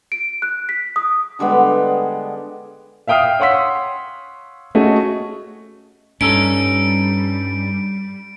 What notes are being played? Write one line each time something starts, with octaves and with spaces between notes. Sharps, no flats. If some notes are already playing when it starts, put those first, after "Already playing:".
D7
F#6
B6
D#6
D3 G3 G#3 B3
E5 F5 G5 D#6 F6 C7
C#5 F5 F#5 C6 E6 B6
A3 C#4 F#4 G#4 D#5
G2 G3 C#4 D#4 A4 D7